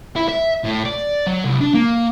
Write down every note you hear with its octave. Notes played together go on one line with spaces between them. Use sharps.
E4
E5
A2
D5
F#3
C2
D4
A#3